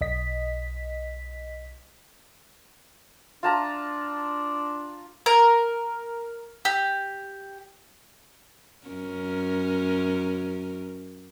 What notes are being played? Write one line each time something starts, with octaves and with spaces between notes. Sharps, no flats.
B1 D#5 B6
D4 F4 A5 A#5
A#4
G4
F#2 C#4 A#4